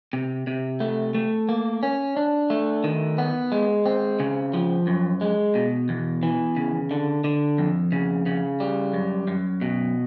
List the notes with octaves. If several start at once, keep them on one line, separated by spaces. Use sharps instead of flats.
C3
C3
A3
A3
A#3
C#4
D4
A3
D#3
B3
G#3
C4
C#3
F3
F#2
G#3
B2
E2
E3
C#3
D3
D3
F2
C#3
C#3
G3
F#2
F#2
B2